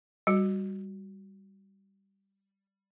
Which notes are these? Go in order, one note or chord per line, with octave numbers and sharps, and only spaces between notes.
G3 F#4